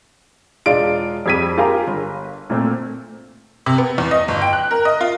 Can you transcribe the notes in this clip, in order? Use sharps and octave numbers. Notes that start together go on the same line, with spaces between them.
E1 G#3 D4 F4 D7
F2 G3 G#6 B6 D#7
F4 G4 G#4 A#4
G1
A#2 A3 C4
C3
B3
E2
D#5
G1
G5
F#6
A#4
D#5
F4